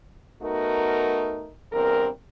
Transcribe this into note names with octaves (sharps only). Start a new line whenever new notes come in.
A3 B3 D#4 F#4 A#4
E2 G2 C4 A#4